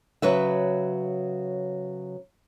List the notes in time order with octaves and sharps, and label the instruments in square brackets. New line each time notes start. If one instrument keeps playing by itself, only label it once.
[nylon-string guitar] C#3 F#3 B4 E5